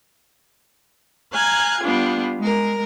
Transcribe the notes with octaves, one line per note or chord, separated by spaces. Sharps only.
F5 G#5 A#5 F#6 G#6
G3 B3 D4 F4
G#3 A#4